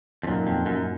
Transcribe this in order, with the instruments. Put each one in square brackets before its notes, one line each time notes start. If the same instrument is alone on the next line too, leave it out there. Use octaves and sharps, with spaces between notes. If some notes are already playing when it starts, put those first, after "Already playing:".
[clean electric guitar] F2
[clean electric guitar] F#2 [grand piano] A#2 F#3 A#3 D#4
[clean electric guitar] F2
F#2